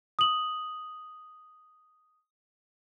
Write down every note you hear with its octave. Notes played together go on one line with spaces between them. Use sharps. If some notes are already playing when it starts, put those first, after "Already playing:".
D#6 F#7